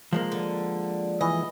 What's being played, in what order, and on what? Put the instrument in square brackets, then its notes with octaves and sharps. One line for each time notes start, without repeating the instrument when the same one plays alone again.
[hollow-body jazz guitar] F3 G#3 A#3
[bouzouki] D3
[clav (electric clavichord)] E3 [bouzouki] D#5